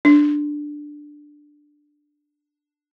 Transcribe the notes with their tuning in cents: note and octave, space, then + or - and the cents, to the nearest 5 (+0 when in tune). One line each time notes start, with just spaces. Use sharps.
D4 +5